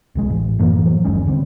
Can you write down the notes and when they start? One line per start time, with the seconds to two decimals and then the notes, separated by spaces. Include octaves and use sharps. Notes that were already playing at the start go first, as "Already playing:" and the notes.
0.15 D1 B1 G#3
0.30 A1
0.59 F#2 A2 E3 A#3
0.85 E3 F#3
1.05 G1 D#2 G#3 C#4
1.27 B2 D3 G3 C4